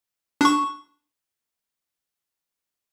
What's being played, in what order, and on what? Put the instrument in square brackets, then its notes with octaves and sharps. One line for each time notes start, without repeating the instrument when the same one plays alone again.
[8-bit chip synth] D4 C#6